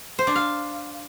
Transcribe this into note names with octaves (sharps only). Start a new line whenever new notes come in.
C5
D4
F5